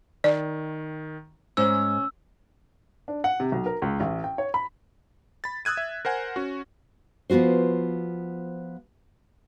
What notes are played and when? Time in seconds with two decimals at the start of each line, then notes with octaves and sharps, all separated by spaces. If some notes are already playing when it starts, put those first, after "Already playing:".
0.24 D#3 D5
1.57 G#2 C#4 E6
3.08 D4
3.24 F#5
3.40 C3
3.52 B1
3.66 A#4
3.82 C#2
4.00 A1
4.24 G5
4.38 C#5
4.54 B5
5.44 B5 A6
5.65 D#6 E6 F#6 G#6 D#7
5.77 E5
6.05 A#4 C5 F#5 G#5
6.36 C#4 F#4
7.30 F3 B3 F4 F#4 C5